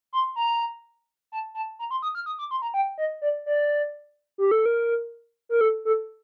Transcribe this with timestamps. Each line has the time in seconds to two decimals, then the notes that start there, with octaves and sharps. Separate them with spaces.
0.13 C6
0.36 A#5
1.32 A5
1.55 A5
1.79 A#5
1.91 C6
2.02 D#6
2.15 F6
2.26 D#6
2.39 D6
2.51 C6
2.62 A#5
2.74 G5
2.98 D#5
3.22 D5
3.46 D5
4.38 G4
4.51 A4
4.66 A#4
5.49 A#4
5.61 A4
5.85 A4